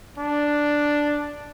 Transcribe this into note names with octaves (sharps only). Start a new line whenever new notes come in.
D4